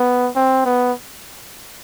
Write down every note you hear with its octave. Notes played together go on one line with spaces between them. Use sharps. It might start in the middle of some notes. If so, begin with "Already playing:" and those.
Already playing: B3
C4
B3